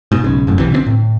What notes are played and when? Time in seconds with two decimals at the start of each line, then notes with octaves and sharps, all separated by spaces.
0.12 G#2 B2
0.24 B1 C#3
0.47 F#1 F#2 A2
0.59 B1 C3 E3
0.72 D3 D#3 C4
0.86 A2